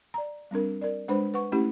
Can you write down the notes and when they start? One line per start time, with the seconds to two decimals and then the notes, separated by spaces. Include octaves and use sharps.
0.14 D5 A#5
0.51 G3 C4 D4 A#4
0.82 A#4 D5
1.08 G#3 D4 B4 C5 B5
1.34 B4 F#5 C#6
1.52 A3 C#4 E4 G4